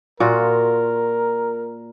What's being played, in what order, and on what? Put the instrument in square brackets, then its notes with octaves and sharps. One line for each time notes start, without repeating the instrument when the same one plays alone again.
[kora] A#2 F4 F#4 [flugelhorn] A#4